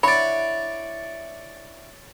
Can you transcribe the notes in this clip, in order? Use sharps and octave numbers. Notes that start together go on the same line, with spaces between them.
D4 E4 C#5 D5 F#5 B5